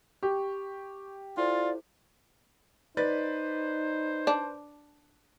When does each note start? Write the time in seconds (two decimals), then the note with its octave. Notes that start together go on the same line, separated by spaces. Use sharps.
0.23 G4 C#6
1.37 E4 F4 A4 C5 D5
2.97 D#4 B4 C5 D5 A6
4.27 D4